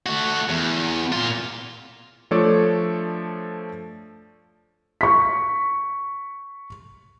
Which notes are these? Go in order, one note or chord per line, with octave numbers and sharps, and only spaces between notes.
A3 F#4
E2
A#2 F4
F3 A3 D4 A4 C#5 D5
C#6 B6